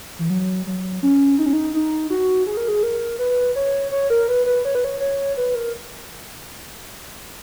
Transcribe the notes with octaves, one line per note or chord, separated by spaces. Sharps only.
E3
F#3
F#3
C#4
D#4
C#4
D#4
D#4
F#4
G#4
A#4
G#4
A#4
B4
C#5
C#5
A#4
B4
B4
C#5
B4
C#5
C#5
B4
A#4